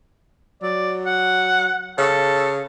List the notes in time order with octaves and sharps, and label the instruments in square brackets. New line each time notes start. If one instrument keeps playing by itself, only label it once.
[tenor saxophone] F#3 [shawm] D5
[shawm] F#5
[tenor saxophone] C#3 [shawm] A4